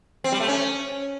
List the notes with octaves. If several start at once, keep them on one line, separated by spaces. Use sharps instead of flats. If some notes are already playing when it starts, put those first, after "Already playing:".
C4
G3
A3
C#4